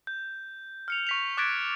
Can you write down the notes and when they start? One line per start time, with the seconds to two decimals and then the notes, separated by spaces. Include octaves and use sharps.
0.07 G6
0.88 F6 C#7 F7
1.07 C#6 B6 F7
1.37 D6 F#6 G#6 A6 B6 D7